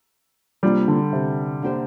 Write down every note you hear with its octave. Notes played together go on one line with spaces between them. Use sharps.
C3 G3 A#3 D4 F4
D3
C3
D3 A#3 G4 C5